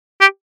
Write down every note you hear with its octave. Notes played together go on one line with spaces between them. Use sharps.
G4